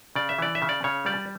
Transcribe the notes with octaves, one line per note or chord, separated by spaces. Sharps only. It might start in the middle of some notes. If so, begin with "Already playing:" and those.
C#3 D5
E5
E3 D5
E5
C#3
D5
C#3 C#5
G3 D5